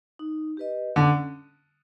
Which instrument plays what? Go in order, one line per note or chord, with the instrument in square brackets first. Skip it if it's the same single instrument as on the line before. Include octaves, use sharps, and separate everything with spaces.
[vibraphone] D#4
G4 B4 D#5
[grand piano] D3 [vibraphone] C#4